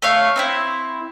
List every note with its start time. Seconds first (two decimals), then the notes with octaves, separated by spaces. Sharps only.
0.02 A3 C#5 F5
0.36 C4 D#4 E4